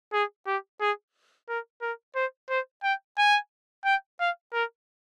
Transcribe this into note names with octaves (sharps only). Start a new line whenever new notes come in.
G#4
G4
G#4
A#4
A#4
C5
C5
G5
G#5
G5
F5
A#4